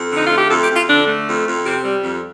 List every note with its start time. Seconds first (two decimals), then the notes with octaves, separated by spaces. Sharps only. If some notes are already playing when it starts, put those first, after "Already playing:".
Already playing: F2
0.11 D3 D#4
0.27 A3 F4
0.38 G4
0.49 F2 A4
0.62 G4
0.68 F2
0.75 F4
0.88 D3 D4
1.07 A3
1.27 F2
1.46 F2
1.65 C3 C4
1.84 G3
2.04 F2